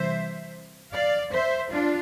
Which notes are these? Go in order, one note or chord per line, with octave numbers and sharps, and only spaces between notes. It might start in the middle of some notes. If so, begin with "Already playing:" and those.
Already playing: C3 E3 G3 C5 E5
D5 F5
C5 E5
D4 F4